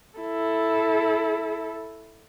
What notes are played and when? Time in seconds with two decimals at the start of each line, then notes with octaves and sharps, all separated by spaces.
0.19 E4 A4